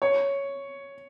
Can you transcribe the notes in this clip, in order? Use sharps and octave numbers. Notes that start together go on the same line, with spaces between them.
C#5